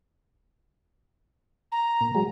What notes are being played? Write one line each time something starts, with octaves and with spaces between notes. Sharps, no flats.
A#5
A#2
F#3 G#3